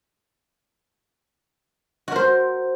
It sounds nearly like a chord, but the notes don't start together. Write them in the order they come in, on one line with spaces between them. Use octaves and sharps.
F#4 A#4 C5